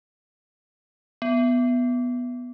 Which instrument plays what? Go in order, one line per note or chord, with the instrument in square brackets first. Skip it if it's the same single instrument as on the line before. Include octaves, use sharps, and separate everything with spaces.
[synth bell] B3